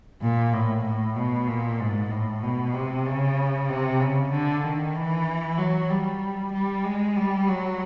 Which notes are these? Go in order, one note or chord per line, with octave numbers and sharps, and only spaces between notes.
A#2
A2
A2
B2
A#2
G#2
A2
B2
C3
C#3
C3
C#3
D3
D#3
E3
F#3
G3
G3
G#3
G3
F#3